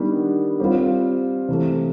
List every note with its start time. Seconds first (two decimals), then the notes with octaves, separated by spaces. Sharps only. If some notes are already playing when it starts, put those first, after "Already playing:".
Already playing: D#3 G3 B3 D4
0.60 G3 C4 F4
1.49 C3 E3 A3